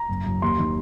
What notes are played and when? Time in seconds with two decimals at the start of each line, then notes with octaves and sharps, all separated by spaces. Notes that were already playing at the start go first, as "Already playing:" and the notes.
Already playing: A#5
0.09 F#1
0.25 F#1
0.42 D#2 C6
0.59 D#3